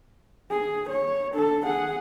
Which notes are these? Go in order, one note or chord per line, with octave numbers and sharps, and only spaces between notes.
G#4
C#5
D4 A4
G#4 F#5